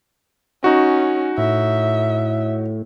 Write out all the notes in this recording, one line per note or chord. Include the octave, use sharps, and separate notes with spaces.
C#4 D#4 F#4
A2 E5